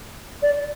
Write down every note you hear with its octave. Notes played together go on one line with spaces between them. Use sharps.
D5